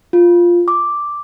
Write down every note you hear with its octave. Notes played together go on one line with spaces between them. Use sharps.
F4
D6